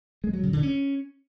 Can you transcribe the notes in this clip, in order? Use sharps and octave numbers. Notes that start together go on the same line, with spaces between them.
G#3
F#3
C#3
D3
C#4